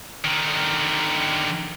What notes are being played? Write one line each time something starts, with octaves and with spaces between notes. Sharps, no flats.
D3 D#3